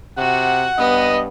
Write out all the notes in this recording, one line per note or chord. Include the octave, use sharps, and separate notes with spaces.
C3 F#4 F#5
G2 B3 D#5